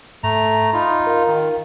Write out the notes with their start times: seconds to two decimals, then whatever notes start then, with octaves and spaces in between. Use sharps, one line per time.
0.24 G#2 A3 A#5
0.73 D#4 F4 B5 C6 D#6
1.07 A#4 F5
1.28 D#3